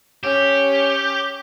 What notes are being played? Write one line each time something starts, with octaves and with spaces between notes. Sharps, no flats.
C#4 G4